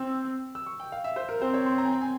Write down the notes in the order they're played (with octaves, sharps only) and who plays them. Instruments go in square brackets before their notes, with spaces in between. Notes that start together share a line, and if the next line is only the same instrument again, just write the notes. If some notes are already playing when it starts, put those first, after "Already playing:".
Already playing: [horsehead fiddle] C4 [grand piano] E6
[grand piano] E6
C#6
G5
F5
E5
C5
A#4
[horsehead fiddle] C4 [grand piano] C5
[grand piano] C#5
C6
A#5
G#5
G5
G#5